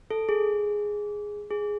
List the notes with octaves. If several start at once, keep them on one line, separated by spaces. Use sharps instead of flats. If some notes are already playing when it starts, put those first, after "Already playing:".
A4
G#4
G#4